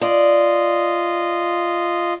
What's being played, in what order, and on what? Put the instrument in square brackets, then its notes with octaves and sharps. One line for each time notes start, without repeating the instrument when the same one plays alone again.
[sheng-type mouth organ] F4 D#5 [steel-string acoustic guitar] D5